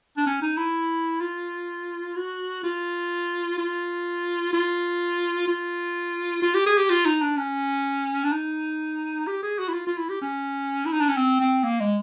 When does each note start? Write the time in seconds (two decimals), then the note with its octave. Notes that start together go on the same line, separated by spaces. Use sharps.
0.17 D4
0.26 C#4
0.42 D#4
0.57 E4
1.21 F4
2.16 F#4
2.63 F4
3.58 F4
4.53 F4
5.48 F4
6.42 F4
6.54 G4
6.66 G#4
6.77 G4
6.90 F4
7.05 D#4
7.22 D4
7.37 C#4
8.24 D4
8.32 D#4
9.27 G4
9.43 G#4
9.58 F#4
9.68 E4
9.74 F4
9.87 F4
9.98 E4
10.09 G4
10.22 C#4
10.86 E4
10.93 D#4
11.01 D4
11.09 C#4
11.17 C4
11.40 C4
11.64 A#3
11.80 G#3